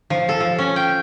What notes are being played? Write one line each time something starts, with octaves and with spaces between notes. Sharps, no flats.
F3
A4
F3
C#4
G5